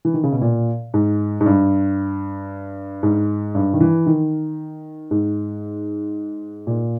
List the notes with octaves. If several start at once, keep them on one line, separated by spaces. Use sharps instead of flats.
E3
D#3
C#3
B2
A#2
G#2
G#2
G2
G#2
G2
D#3
E3
D#3
G#2
A#2